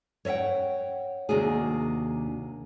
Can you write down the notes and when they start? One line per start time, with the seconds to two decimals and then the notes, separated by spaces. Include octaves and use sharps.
0.25 C#5 D#5 E5 F#5 G5
1.29 D#2 C3 A#3 D4 F#4 G#4